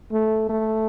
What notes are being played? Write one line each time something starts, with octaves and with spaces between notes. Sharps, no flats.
A3
A3